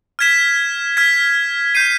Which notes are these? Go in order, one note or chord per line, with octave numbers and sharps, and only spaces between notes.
F6 G#6 B6 E7
F6 G#6 B6
G6 C7 D#7